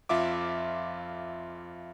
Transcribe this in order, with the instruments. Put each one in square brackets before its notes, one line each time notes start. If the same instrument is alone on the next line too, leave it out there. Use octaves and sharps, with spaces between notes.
[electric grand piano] F2 F4 E5 D6